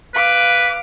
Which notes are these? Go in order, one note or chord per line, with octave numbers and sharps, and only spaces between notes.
B4 F5 D6